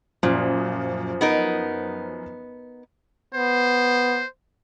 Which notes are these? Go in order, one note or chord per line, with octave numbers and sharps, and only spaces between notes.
F#2 A#2 F3
B3 D#4 A#4
B3 C5